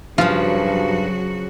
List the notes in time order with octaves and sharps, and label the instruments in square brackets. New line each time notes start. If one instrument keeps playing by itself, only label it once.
[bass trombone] G2 [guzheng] C#3 F3 [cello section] F#3 F#4 [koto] F4